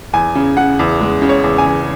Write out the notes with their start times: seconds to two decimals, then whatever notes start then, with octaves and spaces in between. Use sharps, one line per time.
0.13 E2 G#5
0.35 C#3
0.57 C#3 F#5
0.79 E2
1.01 G#3
1.22 C#3
1.29 C#5
1.44 E2
1.58 G#5
1.66 E2